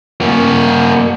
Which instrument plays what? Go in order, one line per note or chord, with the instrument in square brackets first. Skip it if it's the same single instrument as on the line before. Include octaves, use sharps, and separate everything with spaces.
[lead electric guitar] A#3 F#4